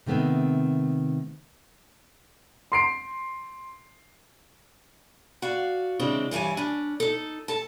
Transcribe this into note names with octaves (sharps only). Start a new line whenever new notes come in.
C3 D#3 A3 B3 C4
C6 C7 D7
F#4 D5 F5
C#3 E3 G#3 C4 D4
G2 E3 G3 C#5 G#5
C#4 D4
D#4 A4
A4 A5